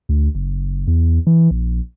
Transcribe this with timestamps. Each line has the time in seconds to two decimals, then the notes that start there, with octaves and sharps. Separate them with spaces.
0.09 D2
0.35 F#1
0.87 E2
1.27 E3
1.51 A#1